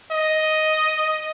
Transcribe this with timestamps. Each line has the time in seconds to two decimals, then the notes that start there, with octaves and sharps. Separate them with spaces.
0.12 D#5